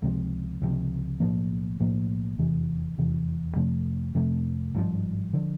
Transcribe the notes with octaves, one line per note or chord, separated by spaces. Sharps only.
C#2 C3 F3
C#2 C3 F3
B1 A2 F3 A#3
B1 A2 F3 A#3
F1 E2 C3 E3
F1 E2 C3 E3
F2 C3 F3 A3
F2 C3 F3 A3
G#1 G2 D3 F3
D3 F3